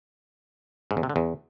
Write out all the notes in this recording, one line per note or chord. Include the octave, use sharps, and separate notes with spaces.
G#2
E2
C3
D3
E2